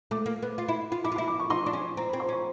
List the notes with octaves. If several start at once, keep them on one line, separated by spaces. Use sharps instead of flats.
A3 D6
A#3
B3
F4
E4
F4
E4 D6
F4
E4 D6
D6
C#6
D#4 C6
D4
C#4
C4 A#5
C4 B5
C6
C#4
C#6